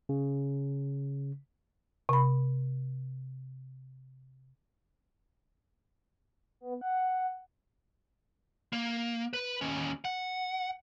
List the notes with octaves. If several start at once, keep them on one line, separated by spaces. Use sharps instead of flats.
C#3
C3 B5
B3
F#5
A#3
B4
D#2 C#4
F#5